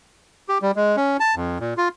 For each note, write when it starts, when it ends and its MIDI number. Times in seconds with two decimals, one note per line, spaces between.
0.49 0.58 67
0.62 0.71 55
0.76 0.96 56
0.97 1.17 61
1.20 1.35 81
1.36 1.58 41
1.60 1.74 46
1.77 1.89 65